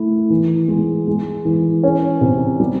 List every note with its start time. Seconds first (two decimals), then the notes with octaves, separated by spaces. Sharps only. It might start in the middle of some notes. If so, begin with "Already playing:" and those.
Already playing: A3 E4
0.30 E3
0.68 G#3
1.07 G#3
1.45 E3
1.84 C#4
2.21 C3
2.60 G3